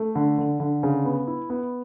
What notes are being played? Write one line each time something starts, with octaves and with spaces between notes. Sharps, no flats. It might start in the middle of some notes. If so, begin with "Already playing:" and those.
Already playing: A3
D3
D3
D3
C#3
B3
E4
B3